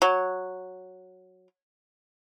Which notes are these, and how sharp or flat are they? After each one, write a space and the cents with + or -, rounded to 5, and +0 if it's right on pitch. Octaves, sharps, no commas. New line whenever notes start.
F#3 -5